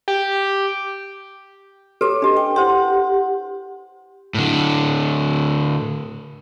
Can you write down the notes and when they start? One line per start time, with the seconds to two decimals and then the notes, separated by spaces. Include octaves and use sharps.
0.08 G4
2.01 G4 A4 B4 C#5 D6
2.22 D4 G4 D#5
2.37 G5
2.56 E4 G4 C5 F#5 C6
4.34 A2 D3